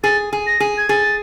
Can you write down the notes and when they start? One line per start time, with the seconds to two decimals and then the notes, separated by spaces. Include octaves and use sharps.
0.04 G#4 A6
0.33 G#4
0.47 A#6
0.60 G#4
0.78 G#6
0.89 G#4 A6